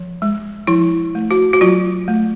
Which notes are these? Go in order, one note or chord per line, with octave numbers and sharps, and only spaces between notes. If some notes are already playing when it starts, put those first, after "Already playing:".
Already playing: F3
G#3
F3 E4
A3
F#4
F#4
F#3 F4
A3